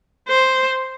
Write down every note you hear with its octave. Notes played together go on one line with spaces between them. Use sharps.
C5